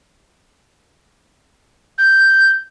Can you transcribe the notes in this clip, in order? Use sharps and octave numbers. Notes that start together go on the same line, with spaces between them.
G6